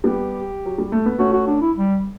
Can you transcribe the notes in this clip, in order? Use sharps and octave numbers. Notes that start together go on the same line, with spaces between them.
G3 B3 G4
F#3
G3
A3
B3
A3 C#4 F#4
F#4
D4
E4
G3